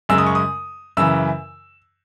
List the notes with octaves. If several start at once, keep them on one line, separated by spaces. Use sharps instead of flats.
F#2 C#3 G#3 E6
D#6
C#6
D#6
F#2 C#3 E3 E6